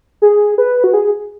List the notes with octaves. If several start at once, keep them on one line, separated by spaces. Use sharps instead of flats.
G#4
B4
F#4
G#4